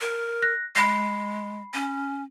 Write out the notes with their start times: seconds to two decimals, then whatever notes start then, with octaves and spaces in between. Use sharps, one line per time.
0.01 A#4
0.42 F#6 A#6
0.76 G#3 B5 C7
1.74 C#4